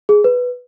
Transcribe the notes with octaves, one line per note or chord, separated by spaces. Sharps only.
G#4
B4